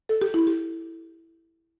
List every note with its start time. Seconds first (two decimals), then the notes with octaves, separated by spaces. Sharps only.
0.09 A4
0.21 G4
0.34 E4
0.47 G4